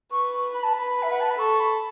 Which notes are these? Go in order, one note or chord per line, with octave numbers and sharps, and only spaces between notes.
B4 C#6
B5
A5
B4 B5
E5
B4 F#5
A5
B5
A4 C#6
B5